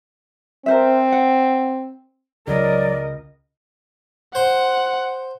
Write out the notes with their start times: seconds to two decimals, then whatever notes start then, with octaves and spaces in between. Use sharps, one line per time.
0.66 C4 A#4 C5 E5
1.12 F#5
2.47 C#2 F#3 A#4 D5 D#5
4.35 C5 F#5 C6